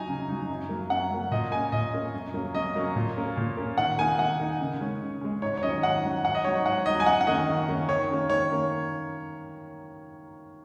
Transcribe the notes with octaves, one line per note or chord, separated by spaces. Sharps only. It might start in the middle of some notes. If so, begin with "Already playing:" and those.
Already playing: F#3 D#4 G#5 A#5
C#3
F#3 D#4
F#2
F#3 A#3
F#2 F#5
F#3 A#3
A#2 D#5
A#3 C#4 G#5
A#2 D#5
A#3 C#4
F#2
F#3 A#3 C#4
F#2 D#5
F#3 A#3 C#4
A#2
A#3 C#4
A#2
A#3 C#4
D#3 F#5
A#3 D#4 G#5
D#3 F#5
A#3 D#4
C#3
G#3 C#4
C#3
G#3 C#4
G#2 C#5
C#5
D#3 F#3 C#4 D#5
G#2 F#5
D#3 F#3 C#4
G#2 F#5
D#5
F#3 D#4 C#5
G#2 F#5
F#3 D#4 D#5
G#5
F#2 F#5
F#5
D#3 A#3 C#4 D#5
F#2
D#3 A#3 C#4
D#3 C#5
A#3 C#4
D#3 C#5
A#3 C#4